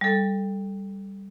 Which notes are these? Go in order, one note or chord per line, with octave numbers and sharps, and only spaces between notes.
G3 A4